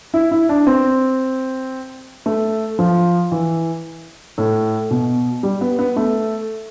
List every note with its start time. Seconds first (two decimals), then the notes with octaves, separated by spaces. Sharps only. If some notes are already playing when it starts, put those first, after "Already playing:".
0.14 E4
0.31 E4
0.49 D4
0.67 C4
2.26 A3
2.79 F3
3.32 E3
4.38 A2
4.91 B2
5.43 G3
5.61 B3
5.79 B3
5.96 A3